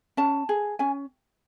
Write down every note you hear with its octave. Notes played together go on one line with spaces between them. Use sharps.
C#4 A5
G#4
C#4 G#5